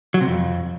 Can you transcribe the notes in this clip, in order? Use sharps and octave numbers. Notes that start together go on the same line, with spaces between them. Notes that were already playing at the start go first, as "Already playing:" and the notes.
F#3
C3
F2